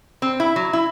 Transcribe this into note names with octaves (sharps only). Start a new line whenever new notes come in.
C4
E4
F#3
E4